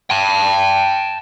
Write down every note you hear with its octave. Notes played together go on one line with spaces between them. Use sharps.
G5 A5